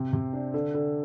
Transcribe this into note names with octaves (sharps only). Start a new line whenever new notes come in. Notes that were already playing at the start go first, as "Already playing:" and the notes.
Already playing: C3 C4
C3
D4
D3
D3